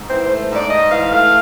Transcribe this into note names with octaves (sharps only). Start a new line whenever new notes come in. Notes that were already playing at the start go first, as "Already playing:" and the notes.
Already playing: G#2
E3 C5
A3 C5
G#2
D5
G#2 D#5
E3 F5
A3 F5